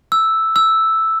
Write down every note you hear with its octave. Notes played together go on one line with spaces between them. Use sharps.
E6
E6